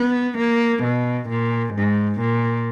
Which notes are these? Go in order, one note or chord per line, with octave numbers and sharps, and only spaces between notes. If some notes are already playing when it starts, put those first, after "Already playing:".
Already playing: B3
A#3
B2
A#2
G#2
A#2